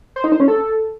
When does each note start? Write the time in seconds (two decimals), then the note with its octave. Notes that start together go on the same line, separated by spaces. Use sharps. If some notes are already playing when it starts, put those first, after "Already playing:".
0.16 C5
0.24 D#4
0.32 C5
0.40 C#4
0.48 A4